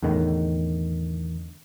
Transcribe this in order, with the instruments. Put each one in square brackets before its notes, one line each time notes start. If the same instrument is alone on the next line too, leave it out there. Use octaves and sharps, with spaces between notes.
[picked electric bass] E2 A2 D3 D#3